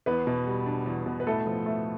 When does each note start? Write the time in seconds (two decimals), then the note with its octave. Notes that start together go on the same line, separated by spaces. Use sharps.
0.06 E2 B3 B4
0.27 B2
0.47 G3
0.66 D4
0.86 E2
1.06 B2
1.20 B4
1.27 A2 A3 A4
1.47 F3
1.66 A3